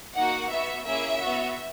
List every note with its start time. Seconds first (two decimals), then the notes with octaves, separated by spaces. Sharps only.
0.16 A#3 D#4 F#4 F#5
0.50 B3 F#4 E5
0.85 A#3 C#4 E4 G#4 E5
1.19 F#4
1.24 B3